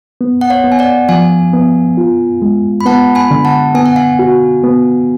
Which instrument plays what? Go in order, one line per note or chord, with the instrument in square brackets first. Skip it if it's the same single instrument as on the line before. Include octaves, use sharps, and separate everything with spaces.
[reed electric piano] B3
[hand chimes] F#5
C#5 F5
[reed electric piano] B3
[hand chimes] G#5
D5 F#5
[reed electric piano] F3 [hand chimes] F5 G#5
[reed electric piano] B3
F4
G#3
[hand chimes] B5
[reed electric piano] B3 [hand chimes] F#5 A5
[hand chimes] G#5 B5
[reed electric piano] D3
[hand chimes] F#5 A5
[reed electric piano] B3 [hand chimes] G#5
[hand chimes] F#5
F5 G#5
[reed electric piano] F#4
B3